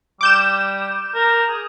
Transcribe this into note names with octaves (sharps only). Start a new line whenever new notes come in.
G3 D6 G6 E7
A#4
G#4